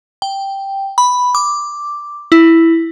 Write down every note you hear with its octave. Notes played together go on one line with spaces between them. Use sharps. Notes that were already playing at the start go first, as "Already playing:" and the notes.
G5
B5
D6
E4